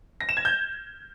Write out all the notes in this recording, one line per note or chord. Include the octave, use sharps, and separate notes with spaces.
A#6
E7
G#6
G6